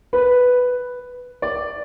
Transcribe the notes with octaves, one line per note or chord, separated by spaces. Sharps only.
B4
D5